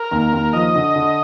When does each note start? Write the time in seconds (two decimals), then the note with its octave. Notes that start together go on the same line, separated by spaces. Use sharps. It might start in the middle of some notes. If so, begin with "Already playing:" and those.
Already playing: A#4
0.11 D#2
0.33 D#2
0.53 F3 D#5
0.75 D3
0.95 D3